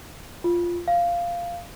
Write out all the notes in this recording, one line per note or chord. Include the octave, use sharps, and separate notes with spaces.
F4
F5